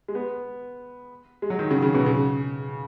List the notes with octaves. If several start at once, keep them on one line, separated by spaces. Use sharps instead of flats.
G#3
B3
G#3
F#3
D#3
C#3
C#3
B2
C#3